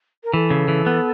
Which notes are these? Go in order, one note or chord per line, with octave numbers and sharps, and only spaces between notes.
A#4
E3 A4
C#3
E3
B3